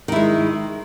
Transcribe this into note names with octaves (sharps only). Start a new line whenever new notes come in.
D#3 G#3 E4